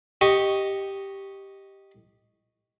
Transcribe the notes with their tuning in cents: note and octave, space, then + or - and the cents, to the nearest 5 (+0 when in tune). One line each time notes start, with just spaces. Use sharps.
G4 +0 D#5 +0 C#6 +0